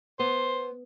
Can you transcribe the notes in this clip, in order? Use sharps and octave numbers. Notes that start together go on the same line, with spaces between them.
B3 C5